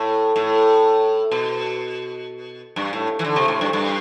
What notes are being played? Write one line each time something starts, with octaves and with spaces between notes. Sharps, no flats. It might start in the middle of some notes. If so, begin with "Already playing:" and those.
Already playing: A2
A2
B2
G2
A2
E3
D3
C3
A2
G2
G2